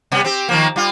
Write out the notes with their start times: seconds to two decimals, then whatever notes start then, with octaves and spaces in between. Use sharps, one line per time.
0.12 C3 G3 B3
0.24 C4 G4
0.49 D#3 F3 A#3
0.76 G3 F4